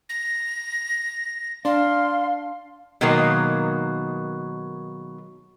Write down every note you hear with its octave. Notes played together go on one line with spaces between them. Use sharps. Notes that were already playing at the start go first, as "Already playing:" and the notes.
A#6
D4 F5 C6
B2 D#3 F#3 G#3 A#3